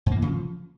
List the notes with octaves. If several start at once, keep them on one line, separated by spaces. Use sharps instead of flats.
G#2
A#3
E3
C#3
F3